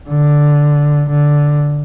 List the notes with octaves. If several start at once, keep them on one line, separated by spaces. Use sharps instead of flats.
D3
D3